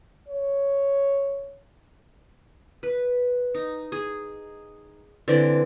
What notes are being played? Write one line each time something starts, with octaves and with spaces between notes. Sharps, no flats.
C#5
B4
D#4
G#4
D3 E3 C4 D5